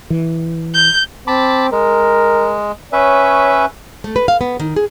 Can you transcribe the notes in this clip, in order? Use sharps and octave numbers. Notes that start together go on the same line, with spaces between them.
E3
G6
C4 A5 B5 D6
G#3 A#4
C#4 B4 C#5 E5
A3
B4
F5
B3
D#3
G#4